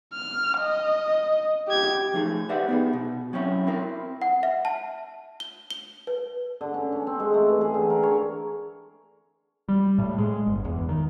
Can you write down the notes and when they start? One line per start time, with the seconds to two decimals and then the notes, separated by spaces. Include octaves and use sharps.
0.14 F6
0.59 D#5
1.68 G4 G#6
2.13 F3 A3 D#4 G#4
2.49 G4 B4 C5 D5 E5 F#5
2.68 B3 D#4 G#4
2.93 B2
3.33 F#3 C4 C#4 E4
3.67 C4 E4 A#4
4.22 F#5
4.43 E5
4.65 A5
5.40 G7
5.71 G7
6.07 B4
6.61 D3
6.74 C#4
6.92 C#4
7.07 C4
7.20 G#3
7.34 A3
7.49 E3
7.61 G#4
7.74 D3
7.90 A#4
8.03 C#5
9.69 G3
9.98 A2
10.18 G#3
10.46 G1
10.65 E2
10.89 D#3